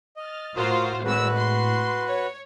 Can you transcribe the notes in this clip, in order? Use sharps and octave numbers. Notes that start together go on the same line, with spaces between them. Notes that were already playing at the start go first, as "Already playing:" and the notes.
D#5 F6 A6
A2 F4 F#4 A#4 C5 C6 D#6
G#1 G#3 F#4 B4 E6
C6
C#5